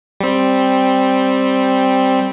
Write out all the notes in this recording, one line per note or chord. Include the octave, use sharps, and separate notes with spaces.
G3 C4